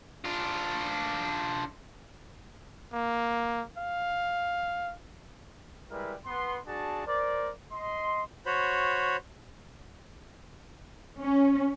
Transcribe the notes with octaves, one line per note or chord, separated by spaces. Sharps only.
D4 F4
A#3
F5
G3 G#3 E4 A#4 B4
B3 C6
D4 F#4 G#4 A5
A#4 C5 D5
D#5 C6
F#4 C5 C#5 B5
C#4